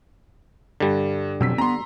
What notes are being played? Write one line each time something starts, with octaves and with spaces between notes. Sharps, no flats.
G2 D3 G3
F2 B2 F#3 C4 E6 B6
B3 C4 A#5 C6